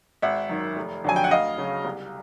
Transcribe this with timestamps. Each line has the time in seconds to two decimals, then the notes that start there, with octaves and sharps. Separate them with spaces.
0.22 G#1 E5 F#5
0.49 F#2 D#3
0.76 F1
1.04 F2 D3 F#3 G#5
1.16 G5
1.24 F#5
1.31 D2 D#5 F5
1.58 C#3 F#3
1.85 C2